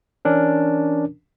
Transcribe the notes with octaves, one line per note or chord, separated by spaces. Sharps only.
E3 C#4 D4 A#4